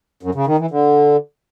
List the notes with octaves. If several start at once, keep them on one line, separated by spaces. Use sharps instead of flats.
F#2
C#3
D#3
E3
D3